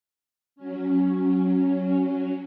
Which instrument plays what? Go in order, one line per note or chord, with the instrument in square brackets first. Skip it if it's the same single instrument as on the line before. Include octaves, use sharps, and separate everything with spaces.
[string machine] F#3 C#4